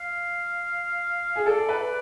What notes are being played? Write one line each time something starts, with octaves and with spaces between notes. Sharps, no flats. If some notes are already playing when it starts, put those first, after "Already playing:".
Already playing: F5
G#4
A4 D5
B4